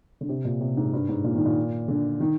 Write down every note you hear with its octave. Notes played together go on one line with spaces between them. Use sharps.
D3
C3
A#2
C3
G#2
G2
G#2
A#2
D#3
A#2
D3
D#3